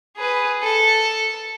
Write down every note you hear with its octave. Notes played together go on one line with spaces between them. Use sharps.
G#4 B4
A4